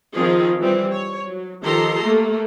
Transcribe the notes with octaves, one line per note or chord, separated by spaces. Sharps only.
D#3 F3 C4 F4 G#4
E3 G3 C4
C#5
F#3
D#3 F3 G4 A4 A#5 C6
A3 A#3